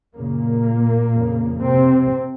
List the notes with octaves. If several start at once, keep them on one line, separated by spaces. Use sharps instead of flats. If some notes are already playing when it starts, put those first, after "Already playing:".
F#2 A#2 C#3 A#3
F2 C#3
C3 C4